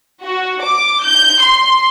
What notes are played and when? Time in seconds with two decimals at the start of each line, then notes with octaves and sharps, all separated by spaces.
0.23 F#4
0.63 D6
1.05 G6
1.43 C6